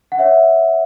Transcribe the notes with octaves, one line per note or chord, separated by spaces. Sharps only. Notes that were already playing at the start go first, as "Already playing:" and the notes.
F#5
C#5 E5